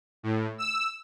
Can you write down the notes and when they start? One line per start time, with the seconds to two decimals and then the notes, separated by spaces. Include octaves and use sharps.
0.23 A2
0.58 E6